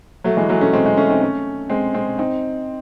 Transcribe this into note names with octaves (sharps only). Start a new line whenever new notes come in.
F#3 A3
E3 G#3
F#3 A3
A3 C#4
G#3 C4
G#3 C4
A3 C#4
C4 D#4
A3 C#4
G#3 C4
G#3 C4
C4 D#4